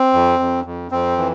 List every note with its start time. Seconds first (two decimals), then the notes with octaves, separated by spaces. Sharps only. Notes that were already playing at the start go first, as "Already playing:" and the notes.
Already playing: C4
0.13 F2
0.40 F2
0.65 F2
0.91 F2 C4
1.18 E3